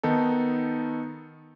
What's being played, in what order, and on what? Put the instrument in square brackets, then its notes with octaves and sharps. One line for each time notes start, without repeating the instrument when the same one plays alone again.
[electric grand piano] D#3 B3 D#4 A4